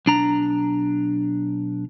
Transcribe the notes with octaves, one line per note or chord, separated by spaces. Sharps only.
B1 D4 A#5